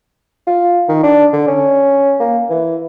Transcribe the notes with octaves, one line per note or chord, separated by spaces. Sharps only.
F4
D#3
D4
D3
C#4
A#3
E3